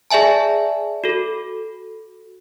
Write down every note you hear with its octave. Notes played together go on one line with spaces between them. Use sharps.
G#4 D5 E5 G#5 A5
F#4 A4